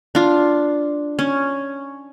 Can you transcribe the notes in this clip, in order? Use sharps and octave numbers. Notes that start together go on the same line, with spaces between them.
D4 F4
C#4